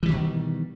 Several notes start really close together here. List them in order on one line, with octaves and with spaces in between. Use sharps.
E3 G3 D#3 B2